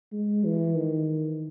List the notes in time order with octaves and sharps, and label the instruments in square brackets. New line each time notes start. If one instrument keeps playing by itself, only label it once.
[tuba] G#3
E3
D#3